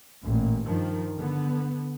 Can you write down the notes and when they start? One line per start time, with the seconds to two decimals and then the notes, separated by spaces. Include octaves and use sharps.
0.23 A1 A#2
0.66 G2 D#3 F3
1.18 D3 B3